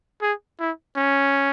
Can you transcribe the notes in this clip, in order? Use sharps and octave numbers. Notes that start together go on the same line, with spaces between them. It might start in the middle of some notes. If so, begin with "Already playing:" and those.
G#4
E4
C#4